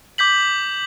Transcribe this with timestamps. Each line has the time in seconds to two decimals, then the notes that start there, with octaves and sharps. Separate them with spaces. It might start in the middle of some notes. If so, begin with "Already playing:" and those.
0.18 D6 G6 B6 F#7